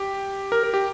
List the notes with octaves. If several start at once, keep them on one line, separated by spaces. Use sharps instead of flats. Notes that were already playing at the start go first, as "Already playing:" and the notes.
Already playing: G4
A#4
A#4
G4